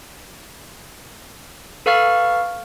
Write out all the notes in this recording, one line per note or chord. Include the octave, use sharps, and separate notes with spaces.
A4 B4 F5 C#6 F6 A6